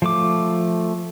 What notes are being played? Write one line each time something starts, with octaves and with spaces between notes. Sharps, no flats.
F3 A3 D6